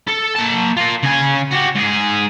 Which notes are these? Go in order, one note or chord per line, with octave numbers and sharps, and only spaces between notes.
A4
A#3 A5
F4 A#4
C#3 G#5
F#4 G4
G#2 G#4